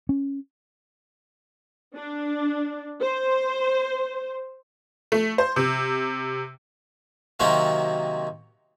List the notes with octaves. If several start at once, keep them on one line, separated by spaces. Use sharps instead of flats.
C#4
D4
C5
A3
C5
C3
C3 D#3 F#3 A#3 C4 C#4